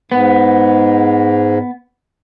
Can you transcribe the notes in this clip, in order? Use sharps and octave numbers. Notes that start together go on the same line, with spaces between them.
G#2 B3